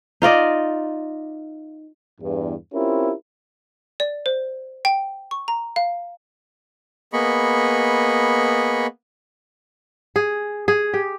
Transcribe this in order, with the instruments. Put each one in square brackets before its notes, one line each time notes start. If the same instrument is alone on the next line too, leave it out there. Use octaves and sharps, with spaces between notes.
[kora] D#4 F4 D5 D#5
[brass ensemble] E2 G2
C4 C#4 E4 F4 G4 A#4
[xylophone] D5
C5
G5
C#6
A#5
F5
[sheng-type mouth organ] A#3 B3 G#4 D#5 B5 C#6
[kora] G#4
G#4
G4